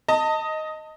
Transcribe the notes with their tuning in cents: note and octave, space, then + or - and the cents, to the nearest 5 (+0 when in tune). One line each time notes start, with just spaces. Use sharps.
D#5 +5 A5 +35